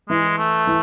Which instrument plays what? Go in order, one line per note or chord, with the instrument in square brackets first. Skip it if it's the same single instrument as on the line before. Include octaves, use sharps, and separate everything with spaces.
[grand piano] E3 [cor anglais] G#3
[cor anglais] A3
[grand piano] E3